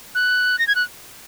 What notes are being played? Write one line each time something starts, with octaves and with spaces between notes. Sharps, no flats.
F#6
A#6
G#6
F#6